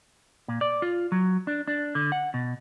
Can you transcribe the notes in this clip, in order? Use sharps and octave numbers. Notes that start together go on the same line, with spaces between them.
A#2
D5
F4
F#3
D4
D4
D3
F#5
B2